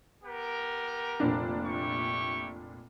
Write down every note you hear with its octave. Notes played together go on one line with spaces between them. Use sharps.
B3 G4 A#4
F1 A#2 D4
E4 G4 C#6